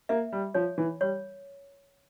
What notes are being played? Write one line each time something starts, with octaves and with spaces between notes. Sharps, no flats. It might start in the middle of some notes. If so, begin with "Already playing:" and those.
A#3 E5
G3
F3 C#5
E3
G3 C#5